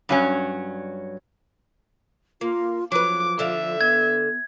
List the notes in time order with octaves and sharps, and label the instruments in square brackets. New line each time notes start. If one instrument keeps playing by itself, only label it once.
[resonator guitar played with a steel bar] G2 F#3 C#4
[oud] A#3 [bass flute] F4
[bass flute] F3 [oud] F#3 B4 [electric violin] D6
[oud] D3 D5 F5 [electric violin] E5
[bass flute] B3 [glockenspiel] G#6